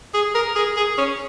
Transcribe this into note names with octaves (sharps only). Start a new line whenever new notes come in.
G#4
A#4
G#4
G#4
C#4